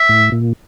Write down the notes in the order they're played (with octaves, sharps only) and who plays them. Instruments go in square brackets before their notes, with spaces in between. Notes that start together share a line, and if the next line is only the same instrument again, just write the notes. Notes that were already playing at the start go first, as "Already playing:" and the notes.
Already playing: [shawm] E5
[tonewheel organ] A2
A#2